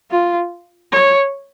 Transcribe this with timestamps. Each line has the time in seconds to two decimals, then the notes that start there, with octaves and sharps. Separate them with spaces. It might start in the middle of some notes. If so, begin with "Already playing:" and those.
0.11 F4
0.92 C#5